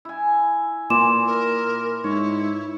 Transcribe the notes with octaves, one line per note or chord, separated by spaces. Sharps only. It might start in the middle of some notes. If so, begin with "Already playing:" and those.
E4 G#5
A#2 E3 C6 D6 E7
A#4
G#2 E4 C#5